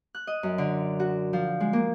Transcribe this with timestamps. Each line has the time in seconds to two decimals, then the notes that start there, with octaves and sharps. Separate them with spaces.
0.15 F#6
0.27 D#5
0.43 F#2
0.58 D3
1.00 F#4
1.33 F3
1.60 G#3
1.73 A#3